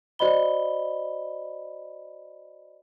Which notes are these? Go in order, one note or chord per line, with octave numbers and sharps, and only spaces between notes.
F#4 C5 D5 D#5 B5 G7